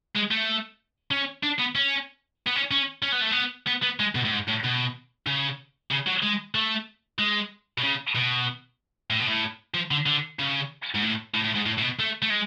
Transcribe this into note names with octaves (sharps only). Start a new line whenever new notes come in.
G#3
A3
C#4
D4
B3
C#4
B3
C#4
C#4
C#4
B3
A3
B3
B3
B3
G#3
B2
A2
G#2
A2
B2
C#3
C#3
F#3
G#3
A3
G#3
B2
C#3
B2
A2
B2
A2
F3
D3
D3
C#3
G#2
A2
A2
A2
G#2
A2
A2
B2
A3
A3
G#3